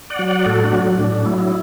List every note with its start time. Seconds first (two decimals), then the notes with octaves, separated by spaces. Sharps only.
0.10 D5 F#5
0.19 F#3
0.28 D5 F#5
0.46 A2 F#4 A4
0.64 D4 F#4
0.73 F#3
0.99 A2 D4
1.12 D4
1.25 F#3 E4
1.38 E4